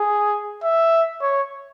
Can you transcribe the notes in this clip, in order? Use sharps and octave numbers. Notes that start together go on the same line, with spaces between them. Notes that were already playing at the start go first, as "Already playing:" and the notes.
Already playing: G#4
E5
C#5